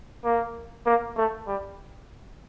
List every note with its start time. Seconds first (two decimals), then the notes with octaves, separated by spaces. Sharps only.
0.24 A#3
0.86 A#3
1.16 A3
1.47 G3